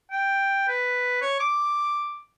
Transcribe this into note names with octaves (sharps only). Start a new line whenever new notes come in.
G5
B4
C#5
D6